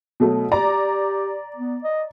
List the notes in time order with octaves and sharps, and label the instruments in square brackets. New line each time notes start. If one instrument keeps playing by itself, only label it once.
[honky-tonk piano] B2 F#3 A3
[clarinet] G4 [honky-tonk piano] D5 A#5
[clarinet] B3
D#5